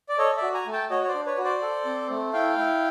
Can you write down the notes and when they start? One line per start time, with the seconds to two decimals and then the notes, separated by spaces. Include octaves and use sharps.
0.09 D5
0.18 A4 C#5 D#5
0.36 D5 E5
0.42 F#4
0.54 G#5 A#5
0.66 A3
0.73 G5 A5
0.90 F#4 C#5 D#5
1.03 C#5
1.08 C5 D5
1.14 D4
1.26 B4 C#5
1.38 F#4
1.44 C5 D5
1.62 A4
1.85 C4
2.10 A3
2.33 E4 F5 G5
2.58 E4